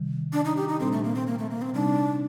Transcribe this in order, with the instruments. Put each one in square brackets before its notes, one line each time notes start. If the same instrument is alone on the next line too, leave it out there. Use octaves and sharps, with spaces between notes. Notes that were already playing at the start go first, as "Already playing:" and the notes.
Already playing: [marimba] C3 D#3 G3
[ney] D4
D#4
G4
D#4
[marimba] A#2 G3 D4 A4 [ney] C4
[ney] A3
A#3
C4
A#3
A3
A#3
C4
[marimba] C3 G3 C4 D#4 [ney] D4